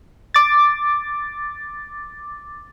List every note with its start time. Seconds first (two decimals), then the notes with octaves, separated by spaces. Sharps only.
0.34 D6 A6